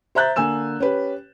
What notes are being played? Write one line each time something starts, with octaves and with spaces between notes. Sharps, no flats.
C5 E5 A#5 F#6 G6 A6
D3 A#3 G#5 E6 E7
C#4 G4 B4